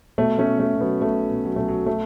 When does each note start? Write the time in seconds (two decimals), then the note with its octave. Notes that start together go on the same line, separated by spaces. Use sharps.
0.18 B2 A3
0.39 A3 C#4
0.46 B2
0.59 A3
0.74 B2
0.81 F#3 B3
1.02 B1 A3
1.31 B2
1.45 F#3
1.56 B1 A3
1.68 F#3
1.86 A3